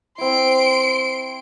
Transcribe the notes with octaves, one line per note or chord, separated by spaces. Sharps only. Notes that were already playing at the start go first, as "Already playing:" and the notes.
C4 E4 C6 D7